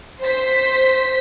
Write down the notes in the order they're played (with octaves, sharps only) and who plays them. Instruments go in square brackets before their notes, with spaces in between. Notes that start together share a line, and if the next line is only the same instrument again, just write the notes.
[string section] C5 B6